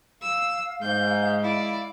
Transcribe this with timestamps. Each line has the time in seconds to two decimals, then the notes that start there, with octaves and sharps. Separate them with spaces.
0.22 F5 E6
0.82 G#2 G#3 G6
1.42 E4 D5